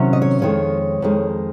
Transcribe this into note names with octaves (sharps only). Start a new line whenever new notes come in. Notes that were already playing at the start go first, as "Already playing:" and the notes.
Already playing: C3 D#3 F#3 C#4
D#5
C#5
F2 D#3 G#3 C#5
F2 D#3 G#3